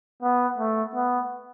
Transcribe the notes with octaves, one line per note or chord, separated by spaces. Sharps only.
B3
A3
B3